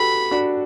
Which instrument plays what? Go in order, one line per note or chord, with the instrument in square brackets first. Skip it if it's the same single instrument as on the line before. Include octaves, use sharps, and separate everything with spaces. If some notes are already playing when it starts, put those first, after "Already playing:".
Already playing: [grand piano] F#4 G4 A4 B4 [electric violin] B5
[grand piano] D4 F#4